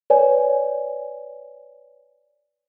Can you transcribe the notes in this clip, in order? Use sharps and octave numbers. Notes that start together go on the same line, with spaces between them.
B4 C#5 D5 G#5